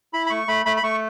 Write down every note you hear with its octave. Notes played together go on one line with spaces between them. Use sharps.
E4 B5
B5
A3 C#6
A3 B5
A3 B5
B5
A3 C#6